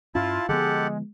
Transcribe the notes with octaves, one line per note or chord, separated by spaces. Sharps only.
G2 C#4 E4 F4 A5
D3 F3 G#3 B3 G4 A4 F#5